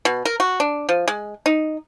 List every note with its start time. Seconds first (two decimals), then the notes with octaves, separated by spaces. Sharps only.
0.05 B2
0.25 A#4
0.40 F#4
0.60 D4
0.89 F3
1.08 G#3
1.46 D#4